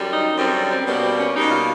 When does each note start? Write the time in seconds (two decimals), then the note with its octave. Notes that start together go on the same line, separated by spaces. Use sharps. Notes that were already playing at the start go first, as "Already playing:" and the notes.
Already playing: F#2 D3 G3
0.13 D#4
0.37 F#2 D3 G3 C4
0.70 C4
0.86 B2 G3 A#3 B3
1.02 C4
1.19 C#4
1.35 B2 G3 A#3 D#4
1.51 F4